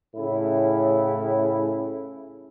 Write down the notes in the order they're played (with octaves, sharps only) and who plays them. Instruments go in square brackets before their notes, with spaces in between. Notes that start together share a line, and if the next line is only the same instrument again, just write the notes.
[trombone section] A2 C#3 E4